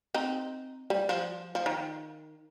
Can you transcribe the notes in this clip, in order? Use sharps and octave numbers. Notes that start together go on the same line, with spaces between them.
C4 D#4
G3
F3
F3
D#3